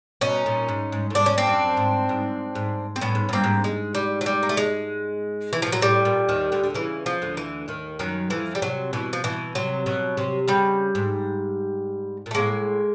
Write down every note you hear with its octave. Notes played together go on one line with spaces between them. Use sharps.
B2 C#4 D#4
A#2
G#2
G#2
A2
G#2 D4
C#4
C4 D4
F#2
G#2
G#2
G#2
C4
A2 B3 C#4
G#2
G2 A#3 C4
G#2
G#3
G3
F#3
G3
A#3
A3
G#3
E3
B2 F3
A#2 F#3
A2 G3
A#2
D#2 D#3
D2 D3
D3
C#3 E3
F3
D2 D3
E3
D#2 D#3
F#2 D#3 F#3
F2 E3 F3
G3
C3 F#3
B2 E3
F3
B2 E3
C3 F#3
B2
C3
C#3 G3
G#2
A#2
A3
A2 G#3 A#3